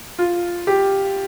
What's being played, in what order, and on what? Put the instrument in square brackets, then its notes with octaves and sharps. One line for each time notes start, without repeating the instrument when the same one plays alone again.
[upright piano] F4
G4